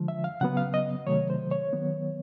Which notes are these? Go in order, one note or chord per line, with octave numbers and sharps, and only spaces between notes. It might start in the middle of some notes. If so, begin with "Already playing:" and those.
Already playing: D3 F3 G#3
E5
F5
C#3 F#3 B3 F#5
F5
D#5
C3 D#3 F#3 A3 C#5
C5
C#5
D#3 F#3 B3